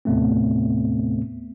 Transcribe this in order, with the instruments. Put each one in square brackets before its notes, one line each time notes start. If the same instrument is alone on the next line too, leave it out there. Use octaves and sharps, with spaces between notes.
[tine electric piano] D#2 A2 C3 A3 B3 C4